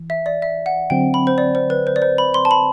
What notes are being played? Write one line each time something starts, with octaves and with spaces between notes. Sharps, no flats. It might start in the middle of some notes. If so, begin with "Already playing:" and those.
Already playing: E3
E5
D5
E5
F#5
D3 F#3 C4 G5
B5
C5
D5
C5
B4
C5
D5
C5
B5
C6
A5
B5